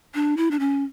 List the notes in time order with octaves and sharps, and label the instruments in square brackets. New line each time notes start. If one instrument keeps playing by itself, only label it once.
[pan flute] D4
E4
D4
C#4